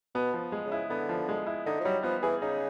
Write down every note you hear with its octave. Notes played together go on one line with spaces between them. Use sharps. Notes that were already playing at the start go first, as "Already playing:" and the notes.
B2 B3
F3
G#3
C#3
E4
D3 B3
F3
G#3
E4
D3 D#4
F3
F#3 G3
F3 B3
E3 G#4
C#3 D#4